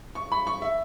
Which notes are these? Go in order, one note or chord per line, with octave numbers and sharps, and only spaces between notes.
C#6
B5
C#6
E5